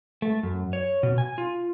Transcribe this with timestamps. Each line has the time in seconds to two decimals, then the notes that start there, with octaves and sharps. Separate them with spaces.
0.22 A3
0.43 F#2
0.73 C#5
1.03 B2
1.18 G#5
1.38 F4